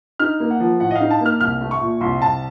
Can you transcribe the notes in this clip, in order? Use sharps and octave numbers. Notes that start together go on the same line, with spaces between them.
D#4 F6
A#3
F#5
F3
A2 F#5
D#5
F5
D#4
A5
A#3 F6
C2 F6
A3
C#6
A#2
C2 C6
C2 A5